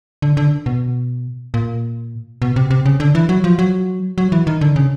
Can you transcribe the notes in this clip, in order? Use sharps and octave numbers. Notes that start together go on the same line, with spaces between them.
D3
D3
B2
A#2
B2
C3
C3
C#3
D3
E3
F#3
F3
F#3
F#3
E3
D#3
D3
C#3